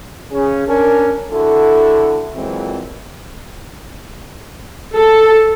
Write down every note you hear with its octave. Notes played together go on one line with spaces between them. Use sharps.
C#3 C#4 G#4
C#4 D4 A#4
D3 E4 F#4 A4
F2 A#2 E3 F#3 G#3 C4
A4